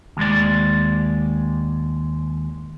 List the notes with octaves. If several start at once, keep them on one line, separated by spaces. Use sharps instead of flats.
D#2 G#3 D5